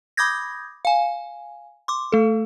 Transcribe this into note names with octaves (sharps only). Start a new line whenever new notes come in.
B5 D6 D#6 G6 G#6 A#6
F5 G#5
C6 D6
A3 A4